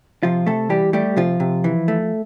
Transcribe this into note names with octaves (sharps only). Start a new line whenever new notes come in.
C3 F3 F4
C3 A3 A4
E3 G3 G4
G3 A3 G4
C3 F3 F4
C3
E3
A3